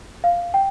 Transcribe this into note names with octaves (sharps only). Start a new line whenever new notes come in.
F5
G5